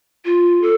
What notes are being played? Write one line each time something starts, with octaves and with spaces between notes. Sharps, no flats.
F4
A4